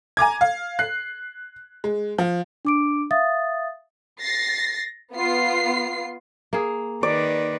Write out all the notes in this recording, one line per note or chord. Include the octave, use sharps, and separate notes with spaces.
G#5 A#5 D6 G#6
F5
F#6 C7
G#3
F3
D4 D6 D7
E5 F5 D#6 A6
A6 A#6 C7
B3 F4 C7
A#3 G#4
D#3 B4 D5